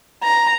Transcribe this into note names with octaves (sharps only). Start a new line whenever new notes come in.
A#5